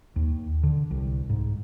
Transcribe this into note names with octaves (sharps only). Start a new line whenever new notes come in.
D#2
D3
C2
G#2